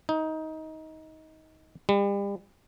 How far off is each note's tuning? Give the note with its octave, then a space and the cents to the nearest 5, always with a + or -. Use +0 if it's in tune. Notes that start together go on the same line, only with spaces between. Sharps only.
D#4 +20
G3 +35